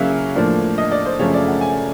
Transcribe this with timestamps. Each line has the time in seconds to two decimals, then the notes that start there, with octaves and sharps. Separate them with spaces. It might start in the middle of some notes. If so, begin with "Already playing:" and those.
Already playing: C#3 F#3 A#3 C#4 E4 E5 F5
0.35 A2 F3 A#3 D4
0.78 D#5
0.91 D5
1.06 C5
1.19 F#2 C#3 F3 A3 C#4 C#5
1.34 D5
1.48 F#5
1.61 G#5